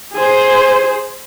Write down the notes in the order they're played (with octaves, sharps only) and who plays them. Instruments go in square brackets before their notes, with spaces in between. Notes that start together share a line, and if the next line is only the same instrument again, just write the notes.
[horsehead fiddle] G#4 C5